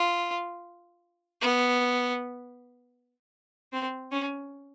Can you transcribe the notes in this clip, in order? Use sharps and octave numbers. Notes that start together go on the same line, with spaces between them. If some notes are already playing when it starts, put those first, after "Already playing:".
Already playing: F4
B3
C4
C#4